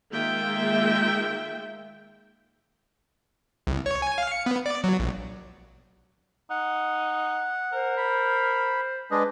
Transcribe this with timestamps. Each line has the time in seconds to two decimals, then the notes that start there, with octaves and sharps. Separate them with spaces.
0.11 D#3 G#3 A#3 F4 E5 G5
3.67 C2
3.86 C#5
4.02 G#5
4.18 F5
4.32 C#7
4.46 B3
4.66 D5
4.84 F#3
4.99 A#1
6.50 D#4 F#5
7.73 A#4 C5
7.97 B5
9.11 G#3 D4 G#4 B4 D#5